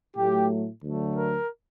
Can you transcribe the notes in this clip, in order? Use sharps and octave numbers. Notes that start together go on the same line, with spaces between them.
A2 F#3 A3 G4
D2 D3 F#3 A3
A#4